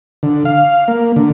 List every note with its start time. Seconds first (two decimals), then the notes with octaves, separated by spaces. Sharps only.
0.23 D3
0.45 F5
0.88 A#3
1.16 D3